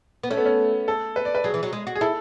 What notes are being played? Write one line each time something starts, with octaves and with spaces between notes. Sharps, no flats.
B3
A3 C#4
B3
C#4
A4
B4
D5
B4
F#3 G#4
E3
F#3
G#3
F#4
G#4
E4 A4